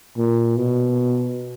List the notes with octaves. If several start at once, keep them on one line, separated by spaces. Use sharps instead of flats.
A#2
B2